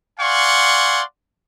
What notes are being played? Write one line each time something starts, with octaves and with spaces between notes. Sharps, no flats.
D5 F5 F#5 G#5 C6 C#6